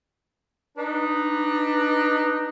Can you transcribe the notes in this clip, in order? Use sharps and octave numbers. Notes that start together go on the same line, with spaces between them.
D4 D#4 B4